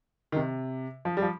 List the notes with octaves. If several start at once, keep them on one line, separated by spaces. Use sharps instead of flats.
D#3
C3
F3
G3
F3